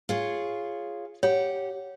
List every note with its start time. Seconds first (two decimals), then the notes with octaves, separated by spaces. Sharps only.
0.09 F4 G#4 C#5
1.23 G4 C#5 F#5